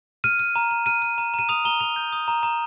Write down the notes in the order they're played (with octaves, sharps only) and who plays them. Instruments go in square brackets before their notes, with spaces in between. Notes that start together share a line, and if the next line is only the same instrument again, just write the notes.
[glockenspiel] F6 D#7
F6
A#5
A#5
F6 D#7
F6
A#5
A#5 D#7
D#6 F7
A#5 G7
A#5 F7
G6
D#6
A#5
A#5